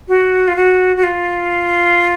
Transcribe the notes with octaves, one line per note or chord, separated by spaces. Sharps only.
F#4
F4
F#4
F#4
F4